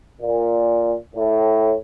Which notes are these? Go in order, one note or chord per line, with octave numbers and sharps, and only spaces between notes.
A#2
A2